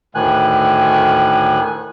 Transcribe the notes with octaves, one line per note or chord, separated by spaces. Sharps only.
D2 A2 D#3 G#5 F#6